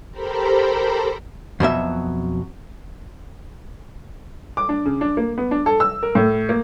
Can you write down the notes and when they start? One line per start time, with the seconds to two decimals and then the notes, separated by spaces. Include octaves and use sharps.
0.11 G4 A4 A#4 C5 A#5 B5
1.60 F2 B2 F#3 E5
4.57 D6
4.69 D4
4.86 C#3
5.01 D4
5.17 A#3
5.38 B3
5.51 D4
5.66 A4
5.80 E6
6.03 A#4
6.15 A2
6.49 A#3